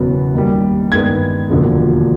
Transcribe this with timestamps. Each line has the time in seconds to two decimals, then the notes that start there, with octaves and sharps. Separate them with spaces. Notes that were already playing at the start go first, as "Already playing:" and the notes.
Already playing: F#1 E2 B2 F#3 B3
0.34 D#2 D#3 G3
0.92 G2 D#3 G#3 B3 G#6
1.50 E1 D#2 D3 F3 G#3